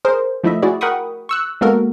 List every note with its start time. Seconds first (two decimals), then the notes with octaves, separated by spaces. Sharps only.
0.05 G#4 A#4 C5
0.44 F3 A3 E4 D#5 E5
0.63 E4 F#4 G#4 D5
0.81 A#4 F#5 G5 B5 C#6 D#6
1.29 C#6 E6 F#6
1.61 G#3 A#3 B3 F#4 A4 A#4